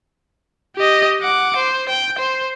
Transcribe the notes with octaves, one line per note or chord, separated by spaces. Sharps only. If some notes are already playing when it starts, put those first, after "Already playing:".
G4 D#5
F#5 D6
C5
G5
C5